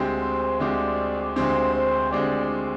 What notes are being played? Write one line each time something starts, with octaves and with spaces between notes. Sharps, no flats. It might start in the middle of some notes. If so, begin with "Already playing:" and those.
Already playing: D2 D3 G#3 C4 G4
C5
D2 D3 G#3 C4 G4 D5
D2 D3 G#3 C4 G4 C5
C5
D2 D3 G#3 C4 G4 D5